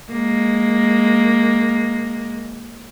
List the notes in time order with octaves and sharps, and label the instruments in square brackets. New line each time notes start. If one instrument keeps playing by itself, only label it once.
[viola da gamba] G#3 A#3